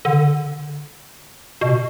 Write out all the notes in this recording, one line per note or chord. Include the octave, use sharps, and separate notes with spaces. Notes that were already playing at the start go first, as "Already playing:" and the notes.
D3
B2